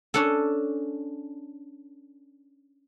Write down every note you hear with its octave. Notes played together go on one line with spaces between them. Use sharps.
C#4 D4 A4